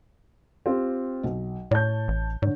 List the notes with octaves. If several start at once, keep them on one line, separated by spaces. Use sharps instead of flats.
C4 F4 G4
B1
A2 C#5 A5 G6
A1
G#2 D3 C#5